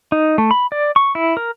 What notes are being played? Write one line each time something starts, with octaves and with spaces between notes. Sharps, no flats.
D#4
A3
B5
D5
C#6
E4
A#4